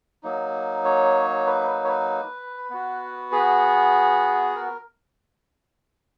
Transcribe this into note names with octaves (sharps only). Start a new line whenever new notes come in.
F#3 A#3 D#4
C#5
B4
B4
C#5
B4
B3 F#4
G#4
A#4